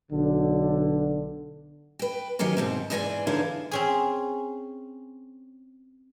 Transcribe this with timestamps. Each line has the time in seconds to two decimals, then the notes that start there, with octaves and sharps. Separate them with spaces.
0.12 B1 D3
1.99 B4 G5
2.39 D#3 E3 F#3 C#4 G4 G#4
2.57 G#2 B2 C4
2.90 E2 G#2 E3 G#4 D5 G#5
3.27 D3 E3 D#4 E4 C#5 F5
3.71 C4 C#4 G#4